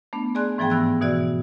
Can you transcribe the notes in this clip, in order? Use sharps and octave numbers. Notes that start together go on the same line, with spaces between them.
A3 B3 D4
G#4 D5 G#5 C6 F#6
G#2 E3 F3 B3 G#4 G5
G2 B3 E6 F#6
B2 E3 F#4 D5 E6